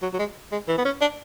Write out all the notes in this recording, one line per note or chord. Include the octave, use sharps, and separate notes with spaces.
F#3
F#3
G#3
G#3
E3
B3
C#4
D4